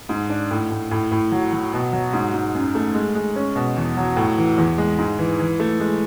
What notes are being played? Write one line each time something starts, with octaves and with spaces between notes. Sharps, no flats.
G#2
D4
A2
A2
A2
A2
F#3
F#3
B2
F#3
G#2
G#2
F#2
A3
G#3
G#3
C#4
B2
E2
F#3
A2
E3
E2
G#3
G#2
E3
E3
A3
G#3